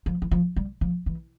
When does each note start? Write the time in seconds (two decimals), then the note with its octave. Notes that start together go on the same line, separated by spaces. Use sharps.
0.06 F3
0.22 E3
0.31 F3
0.56 G3
0.81 F3
1.06 E3